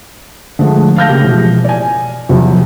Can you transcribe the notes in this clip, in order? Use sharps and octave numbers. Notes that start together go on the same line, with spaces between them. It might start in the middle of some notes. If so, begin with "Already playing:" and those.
D3 F3 G#3 A3
F5 A5 F6 G6 A#6
C#3 A#3 G4
B2 E3 F3 G#3
D5 G#5
E2 C3 F3 F#3